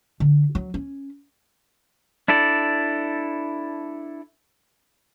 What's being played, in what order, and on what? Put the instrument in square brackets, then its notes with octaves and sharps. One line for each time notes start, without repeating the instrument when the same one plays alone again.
[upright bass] D3
F#3
C#4
[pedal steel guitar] D4 E4 A4 D5